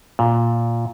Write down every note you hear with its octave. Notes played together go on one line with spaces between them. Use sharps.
A#2